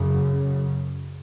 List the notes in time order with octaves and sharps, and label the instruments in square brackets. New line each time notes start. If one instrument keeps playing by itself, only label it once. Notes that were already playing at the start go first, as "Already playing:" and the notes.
Already playing: [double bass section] F#2 C#3